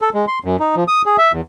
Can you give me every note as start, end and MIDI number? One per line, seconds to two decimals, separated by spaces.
0.02 0.10 69
0.14 0.25 56
0.28 0.39 84
0.44 0.56 42
0.60 0.75 63
0.76 0.84 53
0.88 1.02 87
1.06 1.17 68
1.18 1.32 76
1.32 1.41 40